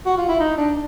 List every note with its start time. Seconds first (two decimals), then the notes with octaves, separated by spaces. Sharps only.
0.06 F#4
0.18 F4
0.29 E4
0.40 D#4
0.58 D4